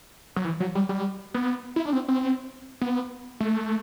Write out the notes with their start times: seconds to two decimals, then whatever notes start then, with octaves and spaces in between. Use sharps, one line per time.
0.36 F#3
0.45 E3
0.60 F#3
0.75 G3
0.89 G3
1.34 B3
1.76 E4
1.85 D4
1.93 C4
2.08 C4
2.81 B3
3.40 A3